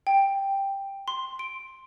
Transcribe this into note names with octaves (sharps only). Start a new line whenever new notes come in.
G5
C6
D7